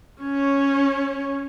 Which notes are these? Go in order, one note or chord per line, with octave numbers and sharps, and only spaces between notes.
C#4 C#5